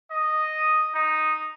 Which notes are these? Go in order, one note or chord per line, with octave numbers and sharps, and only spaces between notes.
D#5
D#4